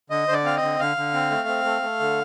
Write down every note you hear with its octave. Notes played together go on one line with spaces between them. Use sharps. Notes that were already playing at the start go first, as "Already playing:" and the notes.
D3 D#5
D3 C5 D5
C4 F5
D#5
D3
D3 F5
D3
C4
A3
C4
A3
A3
D3